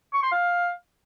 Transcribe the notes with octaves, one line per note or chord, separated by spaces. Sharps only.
C#6
C6
F5